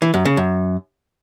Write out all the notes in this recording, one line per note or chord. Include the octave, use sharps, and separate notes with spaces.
E3
F#2
C#3
F#2